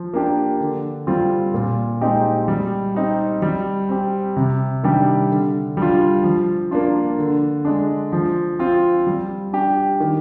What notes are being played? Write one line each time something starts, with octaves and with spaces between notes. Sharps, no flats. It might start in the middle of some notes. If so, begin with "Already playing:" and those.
Already playing: F3
A#3 D4 G4
D3
G3 C4 F4
A#2
G#3 C4 D#4 G4
G3
C4 D#4 G4
G3
C4 G4
C3
D#3 G3 D4 G4
D3
G3 D4 F4
F3
A#3 D4 F4
D3
G#3 D4
F3
C4 F4
G3
D4 G4
D#3